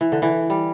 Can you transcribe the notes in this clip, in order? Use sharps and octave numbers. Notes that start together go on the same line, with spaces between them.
E3
D3
E3
G3